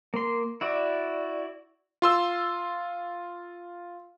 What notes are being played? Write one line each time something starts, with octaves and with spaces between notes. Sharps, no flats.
A#3 C6
E4 F#4 D5
F4 C6 E6